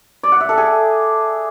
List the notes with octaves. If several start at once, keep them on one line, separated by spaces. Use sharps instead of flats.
D5
F#5
E5
A4
G#4